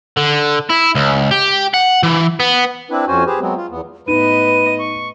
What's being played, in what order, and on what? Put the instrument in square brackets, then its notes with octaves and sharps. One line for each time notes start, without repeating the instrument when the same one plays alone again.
[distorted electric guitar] D3
E4
C#2
G4
F#5
E3
B3
[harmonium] C4 D4 E4 B4
F2 C#4 F#4 C5 G#5
G4 G#4 B4 C5
F#3 G#3 B3 C4
F4
E2 B3
[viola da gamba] A2 B3 D#5 [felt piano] D#4 [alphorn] B4 [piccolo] D#7
[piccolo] C#6